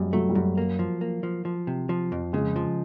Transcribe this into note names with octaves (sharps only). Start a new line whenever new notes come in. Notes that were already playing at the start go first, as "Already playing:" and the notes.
Already playing: F#2 G3 G#3
F#3 A3
G3
F#2 F#3
A#3
F3
A#3
F3
F3
C3
F3
F2
C#3 G#3
F3